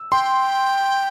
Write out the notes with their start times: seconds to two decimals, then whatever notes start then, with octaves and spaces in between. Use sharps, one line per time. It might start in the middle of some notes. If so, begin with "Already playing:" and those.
Already playing: E6
0.12 G5 C6